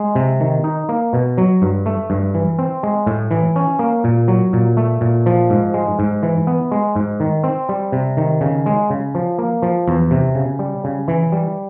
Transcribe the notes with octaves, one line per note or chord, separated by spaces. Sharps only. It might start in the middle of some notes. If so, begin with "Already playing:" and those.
Already playing: G#3
C3
D#3
D#4
A#3
B2
F#3
G2
A3
G2
E3
C4
G#3
A2
E3
C#4
A#3
A#2
F#3
A#2
A3
A#2
F3
G#2
G#3
G#2
E3
B3
G#3
G#2
D#3
C4
G3
C3
D#3
C#3
G#3
C#3
F3
A#3
F3
E2
C3
C#3
G3
C#3
E3
G3